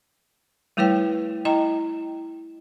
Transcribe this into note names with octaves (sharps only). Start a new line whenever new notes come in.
G3 A3 E4 B4 C#5 G5
E4 D#5 G5 A#5